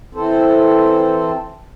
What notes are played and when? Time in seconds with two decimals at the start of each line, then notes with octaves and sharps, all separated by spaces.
0.15 E3 C4 A4 C5